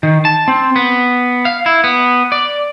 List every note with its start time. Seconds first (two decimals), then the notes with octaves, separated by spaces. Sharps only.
0.03 D#3
0.25 A5
0.48 C4
0.76 B3
1.45 F5
1.66 E4
1.84 B3
2.32 D5